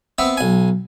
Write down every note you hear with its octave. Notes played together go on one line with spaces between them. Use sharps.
B3 C4 E5
B1 G#5